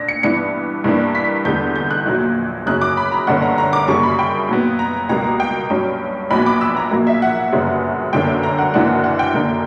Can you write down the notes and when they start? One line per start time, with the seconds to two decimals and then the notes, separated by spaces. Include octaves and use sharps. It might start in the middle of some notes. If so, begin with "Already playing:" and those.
Already playing: A#2 D4 A#6
0.08 C#7
0.23 G2 E3 B3 D4 C#7
0.84 G2 E3 A#3 D4
1.15 B6
1.45 E2 D3 G3 B3 G6
1.76 G6
1.91 F#6
2.06 A#1 A#2 F#3
2.66 F#2 C#3 F#3 C#4 F#6
2.81 D6
2.97 B5
3.12 A#5
3.27 G1 G2 D3 A#3 C#4 F#5
3.42 A#5
3.58 A#5
3.73 D6
3.88 F#2 C#3 G3 A#3 C#6
4.03 B5
4.19 G5
4.49 A#2 F#3 B3
4.79 A#5
5.09 C#2 B2 G3 A#3 A#5
5.40 G5
5.70 G2 F#3 C#4
6.31 A#1 A#2 F#3 B3 B5
6.46 D6
6.61 E6
6.77 A#5
6.91 A#1 A#2 F#3 A#3
7.07 E5
7.22 F#5
7.52 G1 F#2 C#3 G3
8.13 G1 F#2 D3 A#3 C#4 G5
8.43 A#5
8.59 F#5
8.74 F#1 F#2 E3 A#3 D4 F#5
9.04 F#5
9.19 G5
9.34 F#2 D3 A#3 D4